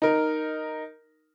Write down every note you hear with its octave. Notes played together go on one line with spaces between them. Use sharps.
D#4 A#4